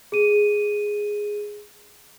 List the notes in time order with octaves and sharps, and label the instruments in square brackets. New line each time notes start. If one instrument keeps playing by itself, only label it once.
[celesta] G#4 D#7